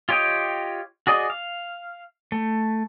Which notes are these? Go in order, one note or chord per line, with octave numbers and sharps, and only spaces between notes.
F4 G4 C#5 D#5 G5
F#4 G#4 D5 D#5
F5
A3